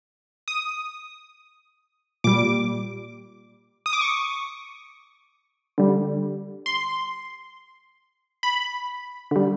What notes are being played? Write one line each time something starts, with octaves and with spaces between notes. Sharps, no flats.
D#6
A#2 G3 D6
D#6
D6
C#6
D3 G3
C6
B5
D3 G3